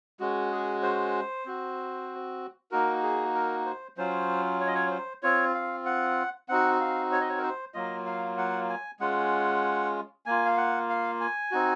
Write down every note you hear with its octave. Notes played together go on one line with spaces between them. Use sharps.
G#3 C#4 F#4
G#4
C5
C4 F#4
A#3 D#4 F#4 A#4
G#4
A#4
C5
F#3 C#4 F4 C5
C#5
D#5
C#5
C5
C4 F4 C#5
F5
F#5
C4 D#4 F#4 F#5
F5
C#5
D#5
C#5
A#4
C5
F#3 A#3 F4 D#5
F5
F#5
G#5
G#3 C#4 F4 F#5
A#3 F4 G#5
F5
F#5
F5
G#5
C4 D#4 F#4